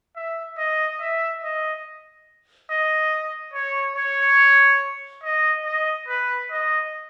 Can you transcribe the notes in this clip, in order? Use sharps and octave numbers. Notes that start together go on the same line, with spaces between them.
E5
D#5
E5
D#5
D#5
C#5
C#5
D#5
D#5
B4
D#5